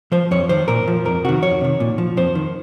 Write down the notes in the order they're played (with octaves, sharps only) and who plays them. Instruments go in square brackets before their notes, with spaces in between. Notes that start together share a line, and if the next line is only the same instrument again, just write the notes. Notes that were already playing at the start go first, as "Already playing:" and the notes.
[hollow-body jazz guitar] F3 C5
F2 C#5
D#3 C5
A#2 A#4
F3
F2 A#4
C3 D#3 F#4
F2 C#5
C3 D#3
A#2
F3
F2 C5
D#3